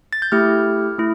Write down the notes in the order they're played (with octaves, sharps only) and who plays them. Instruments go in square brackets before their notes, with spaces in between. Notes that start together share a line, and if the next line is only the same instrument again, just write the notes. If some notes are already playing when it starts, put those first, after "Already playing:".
[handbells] A6
G6
A3 E4 G4 F6
A3 E4